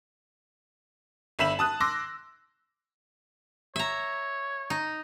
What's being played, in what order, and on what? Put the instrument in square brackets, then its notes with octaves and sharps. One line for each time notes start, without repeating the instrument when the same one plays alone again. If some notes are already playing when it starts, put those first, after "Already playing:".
[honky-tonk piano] G1 E5 B5 E7 F#7
A5 D#6 F#6
C6 D6 E6 A#6
[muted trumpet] C#5 [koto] E5 A#5
[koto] D#4